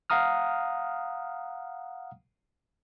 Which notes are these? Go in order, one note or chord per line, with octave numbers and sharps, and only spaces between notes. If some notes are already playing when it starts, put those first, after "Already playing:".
F5 F#5 A#5 D#6 F6